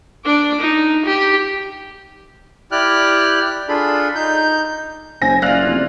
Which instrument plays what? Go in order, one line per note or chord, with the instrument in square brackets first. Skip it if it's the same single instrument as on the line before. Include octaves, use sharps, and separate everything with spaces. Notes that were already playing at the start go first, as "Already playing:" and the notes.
[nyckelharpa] D4 D6
D#4
G4
[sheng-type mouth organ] E4 G4 D5 G5 F6 F#6
D4 F4 G#4 A4 B5
D#4 G6
[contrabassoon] F#1 [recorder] C5 [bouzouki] G#5 [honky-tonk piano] A#6
[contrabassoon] F#1 [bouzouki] E4 F4 [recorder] D5 [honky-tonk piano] F5 F#6 F7
[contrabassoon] F1